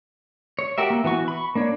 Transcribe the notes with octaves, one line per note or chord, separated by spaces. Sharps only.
C#5
F#4 G4 A#4 E5
A#3
E3 B3 F#4 C#6
B5 C#6
A#3 D4 C#5